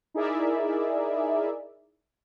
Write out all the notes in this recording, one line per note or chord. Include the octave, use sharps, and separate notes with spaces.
D#4 E4 G#4 A#4 D5 E5